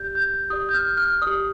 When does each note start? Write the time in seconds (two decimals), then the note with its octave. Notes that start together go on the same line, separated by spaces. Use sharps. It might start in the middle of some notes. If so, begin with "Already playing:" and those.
Already playing: G4 D5 G6
0.15 G6
0.50 G4 D5 D#6
0.69 G6
0.74 F6
0.97 F6
1.22 D5 D#6
1.26 G4